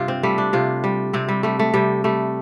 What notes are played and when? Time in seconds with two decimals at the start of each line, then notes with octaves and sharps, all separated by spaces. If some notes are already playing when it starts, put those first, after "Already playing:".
Already playing: G2 C3 F4 G4
0.08 C4
0.23 G3 A3
0.38 D4
0.53 C3 F4
0.84 G3
1.13 C3 C4
1.29 G3
1.43 G3 A3
1.59 A3
1.74 C3 G3
2.04 G3 A3